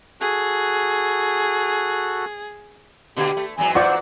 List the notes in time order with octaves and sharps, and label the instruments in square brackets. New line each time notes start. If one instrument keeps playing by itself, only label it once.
[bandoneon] F#4 A4 F#6 [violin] G#4
[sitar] B2 D3 A#3 [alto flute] G4
[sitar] A3
[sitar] E2 G#2 F#3 [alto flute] G#5
[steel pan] F4 D5 C#6 [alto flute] C5 [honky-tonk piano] F#5 D6